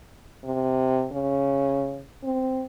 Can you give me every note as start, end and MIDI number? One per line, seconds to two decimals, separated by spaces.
0.45 1.07 48
1.12 2.04 49
2.23 2.65 60